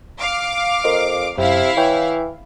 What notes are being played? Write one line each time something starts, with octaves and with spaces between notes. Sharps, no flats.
F5 D6
F2 A#4 C5 D#5
F#2 C3 E4 F5
E3 C#5 G5